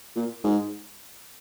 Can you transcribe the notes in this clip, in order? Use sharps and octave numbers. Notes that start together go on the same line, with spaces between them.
A#2
G#2